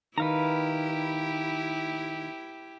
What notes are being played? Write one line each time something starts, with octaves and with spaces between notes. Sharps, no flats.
D#3 E4 G4 B4 F5 A#5